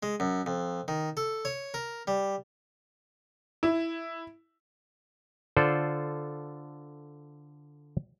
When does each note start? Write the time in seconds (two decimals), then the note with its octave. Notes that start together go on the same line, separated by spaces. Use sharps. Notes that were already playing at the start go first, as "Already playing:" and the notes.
0.03 G#3
0.20 F#2
0.46 F2
0.88 D#3
1.17 A4
1.45 C#5
1.74 A#4
2.07 G3
3.63 E4
5.57 D3 F4 A4 C5 D5